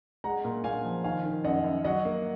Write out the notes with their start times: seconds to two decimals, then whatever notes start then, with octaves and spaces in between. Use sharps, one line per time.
0.24 G#3 F#5 A#5
0.45 A#2
0.64 A#2 F5 G#5
0.85 F3
1.04 D#3 F5 G#5
1.24 D#3
1.44 F#2 D#5 F#5
1.64 F#2
1.84 F#3 D#5 F#5
2.05 A#3